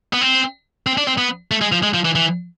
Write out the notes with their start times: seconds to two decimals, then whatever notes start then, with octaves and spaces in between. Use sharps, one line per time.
0.13 B3
0.21 C4
0.87 C4
0.98 D4
1.07 C4
1.18 B3
1.51 A3
1.61 G#3
1.72 F3
1.83 G#3
1.94 F3
2.05 E3
2.16 E3